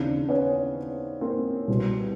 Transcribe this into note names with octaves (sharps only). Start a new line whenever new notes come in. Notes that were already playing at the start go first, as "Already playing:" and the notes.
Already playing: D#2 C#3 E3 C4 D4
B3 C#4
A#3 C4
C2 B2